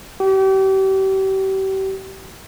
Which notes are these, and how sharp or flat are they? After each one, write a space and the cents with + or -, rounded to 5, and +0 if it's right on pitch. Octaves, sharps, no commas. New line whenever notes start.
G4 -35